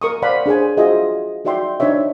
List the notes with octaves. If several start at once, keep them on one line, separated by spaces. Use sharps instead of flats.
A#4 C#6 D#6
C5 D5 F5 F#5 B5
D4 G#4 C5 G#5
F4 F#4 G#4 C5 D#5 E5
D#4 F#4 D5 E5 G5 C6
D4 D#4 C5 C#5 E5